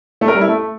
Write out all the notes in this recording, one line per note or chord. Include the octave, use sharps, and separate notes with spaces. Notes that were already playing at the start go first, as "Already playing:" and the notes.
A3
A#4
G3
E4
A3